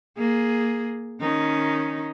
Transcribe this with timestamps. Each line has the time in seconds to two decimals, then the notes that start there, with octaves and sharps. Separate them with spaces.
0.17 A#3 G#4
1.20 D#3 C#4 D#4